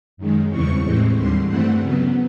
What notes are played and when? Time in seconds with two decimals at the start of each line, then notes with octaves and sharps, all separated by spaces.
0.17 F#2 D#3 G#3
0.49 E2 C#3 E3 G3 C4 C#6
0.83 A2 E3 G#3 C4
1.16 D#2 D3 G3 C6
1.47 G2 E3 A3 C4 F#5
1.80 C#3 F#3 B3